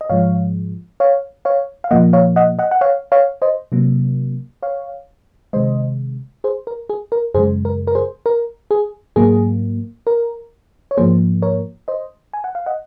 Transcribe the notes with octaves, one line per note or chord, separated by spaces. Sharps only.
D#5
G#2 F3 G#3 C#5 F5
C#5 F5
C#5 F5
F5
A#2 F3 A#3 D#5 F#5
C#5 F5
D#5 F#5
D#5 F#5
F#5
C#5 F5
C#5 F5
C5 D#5
C3 F#3 A#3
C#5 F5
C3 D#3 G#3 C5 D#5
G#4 C5
A#4
G#4
A#4
F#2 C#3 G#3 G#4 C5
A#4
A#4
G#4 C5
A#4
G#4
G#2 F#3 A#3 G#4
A#4
C#5
G#2 F3 A#3 G#4 C5
A#4 C#5
C5 D#5
G#5
F#5
F5
D#5 F#5